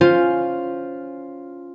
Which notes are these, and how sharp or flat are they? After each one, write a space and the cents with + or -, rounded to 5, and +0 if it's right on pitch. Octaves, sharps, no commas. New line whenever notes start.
C#4 +5 F4 +0 C5 +0